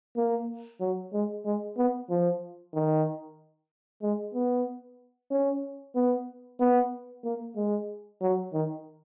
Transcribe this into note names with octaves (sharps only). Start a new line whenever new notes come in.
A#3
F#3
G#3
G#3
B3
F3
D#3
G#3
B3
C#4
B3
B3
A#3
G#3
F#3
D#3